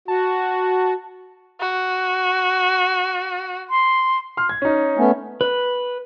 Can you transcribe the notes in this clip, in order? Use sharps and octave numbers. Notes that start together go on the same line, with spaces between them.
F#4 A5
F#4
C6
C6 F6
G#6
C#4 D#4
A3 B3 C#4
B4